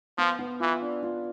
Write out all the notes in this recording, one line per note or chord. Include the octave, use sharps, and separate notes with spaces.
F3 B3
B3
E3 F4
D4
F4